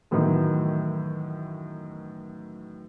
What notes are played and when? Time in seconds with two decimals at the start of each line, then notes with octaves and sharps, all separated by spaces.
0.11 F#2 A2 D#3 E3 B3 D#4